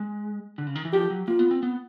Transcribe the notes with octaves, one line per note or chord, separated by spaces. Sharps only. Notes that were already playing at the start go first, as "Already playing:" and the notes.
Already playing: G#3
D3
C#3
D#3
E3
F3 G4
F#3
A#3 F4
B3
C4
B3